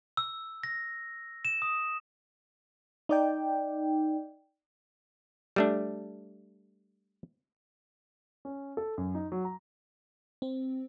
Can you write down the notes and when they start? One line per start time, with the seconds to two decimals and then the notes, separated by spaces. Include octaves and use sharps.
0.17 E6
0.63 A#6
1.45 E7
1.62 D#6
3.09 D#4 D5 G5
5.56 G3 A3 D4
8.45 C#4
8.77 A4
8.98 F#2
9.15 D#4
9.32 F#3
9.45 A#5
10.42 C4